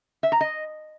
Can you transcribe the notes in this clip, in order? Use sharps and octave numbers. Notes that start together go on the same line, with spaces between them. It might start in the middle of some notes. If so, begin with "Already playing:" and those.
E5
A#5
D#5